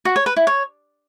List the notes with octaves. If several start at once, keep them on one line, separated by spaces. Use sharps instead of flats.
F#4
C#5
B4
E4
C#5